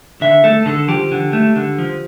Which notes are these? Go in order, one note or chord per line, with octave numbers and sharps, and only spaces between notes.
D3 E5
A3 A4
D3 A4
F3 G4
D3
A3
D3
F3